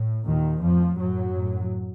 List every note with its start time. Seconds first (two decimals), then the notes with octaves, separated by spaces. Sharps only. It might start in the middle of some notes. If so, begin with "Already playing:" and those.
Already playing: A2
0.26 D#2 A#2 D#3
0.62 F2 A2 F3
0.98 F#2 A2 F#3
1.34 A2